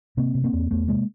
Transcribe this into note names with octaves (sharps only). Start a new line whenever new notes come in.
C3 A#3 C4
C3
A#3 C4
E2
E2 A3 B3
C3 G#3 A#3